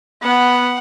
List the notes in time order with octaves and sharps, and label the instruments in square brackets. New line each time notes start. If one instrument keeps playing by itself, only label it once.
[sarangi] B3 [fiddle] F#5